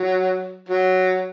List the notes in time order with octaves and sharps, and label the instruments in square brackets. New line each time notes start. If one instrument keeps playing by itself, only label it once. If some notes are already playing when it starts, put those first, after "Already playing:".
Already playing: [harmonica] F#3
F#3